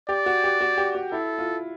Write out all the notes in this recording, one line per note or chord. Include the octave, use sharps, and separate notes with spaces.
G4 D5
F#4
G4
F#4
G4
F#4
E4 A4
F4